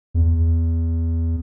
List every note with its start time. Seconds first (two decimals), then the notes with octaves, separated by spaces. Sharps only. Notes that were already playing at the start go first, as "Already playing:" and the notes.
0.14 E2